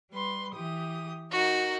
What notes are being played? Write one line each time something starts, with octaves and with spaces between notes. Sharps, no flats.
G3 B4 C6
E3 G4 D#6
D#4 F#4 A#4